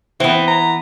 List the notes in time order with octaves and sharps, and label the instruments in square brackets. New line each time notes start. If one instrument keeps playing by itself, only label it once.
[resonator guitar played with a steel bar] E3 B3 [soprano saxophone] C4
[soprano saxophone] A#5